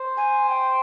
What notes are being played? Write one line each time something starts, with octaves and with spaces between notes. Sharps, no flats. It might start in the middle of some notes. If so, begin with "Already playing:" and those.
Already playing: C5
G#5
G5